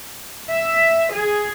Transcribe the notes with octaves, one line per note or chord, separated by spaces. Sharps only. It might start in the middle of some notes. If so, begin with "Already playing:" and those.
E5
G#4